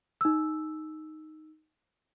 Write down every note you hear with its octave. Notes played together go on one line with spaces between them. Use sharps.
D#4 E6